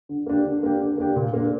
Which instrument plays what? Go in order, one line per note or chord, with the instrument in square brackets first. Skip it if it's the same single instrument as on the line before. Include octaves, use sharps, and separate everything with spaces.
[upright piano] D3
A#3 D4 G4
D3
A#3 D4 G4
D3
A#3 D4 G4
A#2
A#3 D4